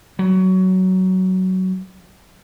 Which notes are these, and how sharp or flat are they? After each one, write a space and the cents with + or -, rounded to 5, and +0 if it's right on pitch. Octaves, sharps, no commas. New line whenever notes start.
F#3 +15